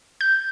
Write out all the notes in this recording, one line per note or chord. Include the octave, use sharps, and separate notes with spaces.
G6